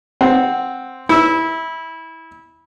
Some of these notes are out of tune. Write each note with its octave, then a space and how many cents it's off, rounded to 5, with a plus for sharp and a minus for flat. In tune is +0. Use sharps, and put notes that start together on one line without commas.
C4 +0 F#5 +0
E4 -20 E6 +0